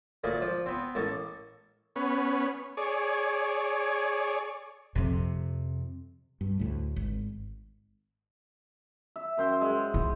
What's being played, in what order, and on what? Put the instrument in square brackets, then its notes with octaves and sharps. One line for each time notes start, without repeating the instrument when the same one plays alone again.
[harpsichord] D2 A#2 A#3
F3
B3 C4
A1 A#3 A4
[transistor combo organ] B3 C#4
G#4 C#5 D5
[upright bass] F2 C3
[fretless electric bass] G2
D2 A2
G#1
[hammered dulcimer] E5
F#2 C5 G5
G#3
[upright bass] E4